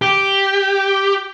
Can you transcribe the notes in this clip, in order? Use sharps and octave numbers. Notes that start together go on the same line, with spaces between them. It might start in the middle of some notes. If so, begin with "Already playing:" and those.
G4